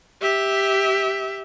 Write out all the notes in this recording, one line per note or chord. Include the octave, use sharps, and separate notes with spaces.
G4 E5